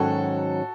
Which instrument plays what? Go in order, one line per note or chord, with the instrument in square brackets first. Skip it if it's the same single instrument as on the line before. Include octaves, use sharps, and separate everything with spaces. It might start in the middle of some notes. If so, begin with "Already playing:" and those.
Already playing: [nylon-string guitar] G#2 D#3 F#3 C#4 [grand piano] F#4 A4